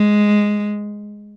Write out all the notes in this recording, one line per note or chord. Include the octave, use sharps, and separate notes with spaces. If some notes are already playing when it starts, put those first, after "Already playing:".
Already playing: G#3